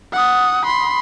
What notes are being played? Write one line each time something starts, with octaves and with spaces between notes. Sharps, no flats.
F#5 D#6
B5 C6